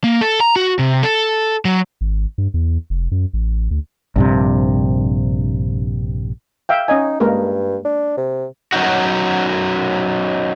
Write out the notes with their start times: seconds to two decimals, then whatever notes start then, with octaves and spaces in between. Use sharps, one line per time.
0.04 A#3
0.21 A4
0.40 A#5
0.56 F#4
0.79 C3
1.03 A4
1.65 F#3
2.01 G#1
2.38 G2
2.54 E2
2.90 F1
3.11 F#2
3.33 A1
3.71 D2
4.16 A#1 G2 C3
6.69 E5 F5 G5
6.88 C#4 D#4 D#5 G#5
7.20 G2 G#3 A#3 A#4
7.85 D4
8.17 C3
8.72 F#3 C#4 D#4 F#4